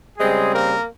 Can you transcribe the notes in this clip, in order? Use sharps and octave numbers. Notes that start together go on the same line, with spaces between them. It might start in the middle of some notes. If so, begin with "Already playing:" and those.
C#3 G3 G#3 C4 G#4
A#3 A#4